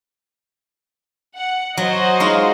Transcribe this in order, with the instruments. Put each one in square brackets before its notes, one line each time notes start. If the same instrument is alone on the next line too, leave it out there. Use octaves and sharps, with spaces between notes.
[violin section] F#5
[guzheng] F#3 [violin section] F#4 C5 D#5
[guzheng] G#3 D#4 F4